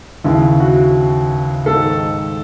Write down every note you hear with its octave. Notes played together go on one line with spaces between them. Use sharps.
D#2 C#3 E3 E4
F#4
G#2 D#3 A4